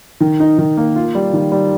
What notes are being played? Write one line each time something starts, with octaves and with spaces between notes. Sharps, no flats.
D#3
D#4
D#3
A#3
F4
G3
D#3
G3